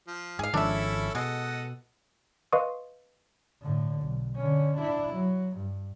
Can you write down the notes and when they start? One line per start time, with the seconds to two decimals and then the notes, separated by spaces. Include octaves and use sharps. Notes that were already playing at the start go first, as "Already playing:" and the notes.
0.07 F3
0.39 G#2 G#4 F5
0.54 G#1 F3 G#3 C#4 D4 E4 A4 E5
1.15 B2 G#3 A4 D#5 F#5
2.53 B4 D#5 F5 C6 C#6 D#6
3.61 A2 D3
4.01 B1
4.36 D3 C#4
4.77 D4 E4
5.14 F#3
5.57 G2